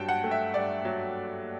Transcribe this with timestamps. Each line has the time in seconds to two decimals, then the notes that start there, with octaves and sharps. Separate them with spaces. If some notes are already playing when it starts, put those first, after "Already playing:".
Already playing: G2 F#3 G5 A5
0.09 F#5
0.24 A3
0.31 E5
0.54 G2 D5
0.85 F#3